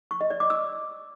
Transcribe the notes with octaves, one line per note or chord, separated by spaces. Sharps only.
C#6
D#5
D5
D6
E6